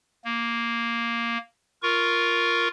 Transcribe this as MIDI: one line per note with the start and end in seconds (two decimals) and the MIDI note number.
0.25 1.38 58
1.82 2.68 65
1.82 2.68 70
1.82 2.68 85